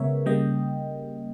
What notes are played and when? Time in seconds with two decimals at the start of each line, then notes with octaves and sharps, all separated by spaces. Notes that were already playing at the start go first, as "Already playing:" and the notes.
Already playing: C#3 G#3 B3 A#4 C#5 E5
0.26 C#3 G3 A#3 D#5 G5